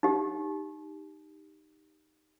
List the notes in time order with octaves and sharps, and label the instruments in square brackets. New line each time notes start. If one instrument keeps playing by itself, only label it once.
[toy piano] D#4 G4